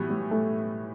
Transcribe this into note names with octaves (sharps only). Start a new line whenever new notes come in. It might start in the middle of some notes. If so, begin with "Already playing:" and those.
Already playing: A2 E3 F#3 G3 B3
G3
A3